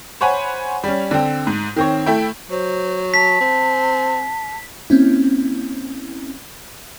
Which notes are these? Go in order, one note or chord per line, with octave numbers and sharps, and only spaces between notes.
C5 C#5 F#5 G#5 B5
G3 C#4
D3 C4
G#2
D#3 C4 C#5
A3 E4 G5
F#3 C5
A5 B6
C4
A#3 C4 C#4 E4